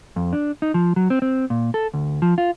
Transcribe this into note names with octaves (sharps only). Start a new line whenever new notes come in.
F2
D4
D#4
F3
F#3
C4
C4
A#2
A4
D2
F3
F4